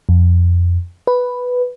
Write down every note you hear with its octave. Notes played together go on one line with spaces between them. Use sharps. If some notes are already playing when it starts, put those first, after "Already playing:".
F2
B4